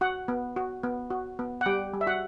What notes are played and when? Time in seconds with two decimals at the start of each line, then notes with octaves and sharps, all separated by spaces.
0.01 F#4 F#5
0.28 B3
0.56 F#4
0.83 B3
1.10 F#4
1.39 B3
1.61 F#5
1.66 G3 G4 G5
1.94 G3
2.01 E5
2.07 F#4 F#5